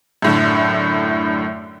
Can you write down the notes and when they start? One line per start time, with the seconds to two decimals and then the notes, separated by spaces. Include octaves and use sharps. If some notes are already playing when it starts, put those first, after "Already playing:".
0.22 F#2 A2 D3